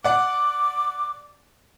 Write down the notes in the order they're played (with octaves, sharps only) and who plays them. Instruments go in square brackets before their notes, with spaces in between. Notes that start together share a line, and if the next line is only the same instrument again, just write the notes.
[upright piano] D5 F#5 [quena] D6